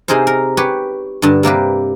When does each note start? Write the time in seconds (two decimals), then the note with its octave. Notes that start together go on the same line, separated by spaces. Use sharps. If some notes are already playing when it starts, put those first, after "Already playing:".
0.08 C3 D#4 G#4 A#4 C5
0.27 A#4
0.57 G4 B4 C#5
1.22 G2 D3
1.43 C3 A#3 G4 B4